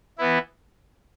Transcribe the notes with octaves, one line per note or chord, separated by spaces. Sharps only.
E3 B3 E4